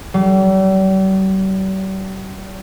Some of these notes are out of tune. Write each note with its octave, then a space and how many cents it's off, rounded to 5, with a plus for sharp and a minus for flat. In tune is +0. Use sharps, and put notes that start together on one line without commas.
G3 -45